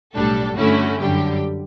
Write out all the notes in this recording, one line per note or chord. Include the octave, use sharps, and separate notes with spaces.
B1 A2 G3 D4 A4
G2 D3 A3 C#4 E4 F#4
F#2 D3 G3 G4